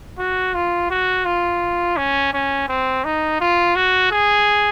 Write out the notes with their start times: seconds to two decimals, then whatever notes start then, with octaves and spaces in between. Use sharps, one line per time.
0.19 F#4
0.54 F4
0.90 F#4
1.25 F4
1.97 C#4
2.33 C#4
2.68 C4
3.04 D#4
3.40 F4
3.76 F#4
4.11 G#4